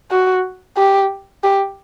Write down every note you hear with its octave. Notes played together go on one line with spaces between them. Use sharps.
F#4
G4
G4